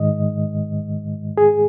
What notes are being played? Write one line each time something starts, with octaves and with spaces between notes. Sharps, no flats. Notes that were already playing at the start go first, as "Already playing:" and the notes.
Already playing: G#2 D#3 G#3 D#5
G#4